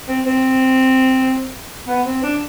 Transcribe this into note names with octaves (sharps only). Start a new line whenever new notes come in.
C4
C4
B3
C4
D4